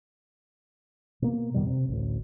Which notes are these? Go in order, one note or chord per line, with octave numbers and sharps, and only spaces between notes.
B2 A#3
F2 B2 D#3 G3
C3
A1 D2